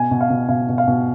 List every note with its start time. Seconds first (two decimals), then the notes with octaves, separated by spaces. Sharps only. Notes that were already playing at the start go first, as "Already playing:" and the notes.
Already playing: B2 G#5
0.11 B2
0.21 F5
0.30 B2
0.49 B2 F5
0.69 B2
0.78 F5
0.88 B2